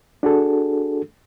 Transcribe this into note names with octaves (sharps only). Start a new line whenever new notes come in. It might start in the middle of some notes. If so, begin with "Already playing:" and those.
D4 F#4 G#4 A4